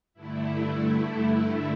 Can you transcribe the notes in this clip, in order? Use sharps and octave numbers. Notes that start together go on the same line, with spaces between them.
G2 D3 A3 E4